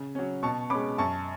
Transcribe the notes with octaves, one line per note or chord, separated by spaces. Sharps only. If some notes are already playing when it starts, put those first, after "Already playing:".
Already playing: C#3
F#3 C#4
B2 A5 C#6
G#3 C#4 B5 D6
F#2 A5 C#6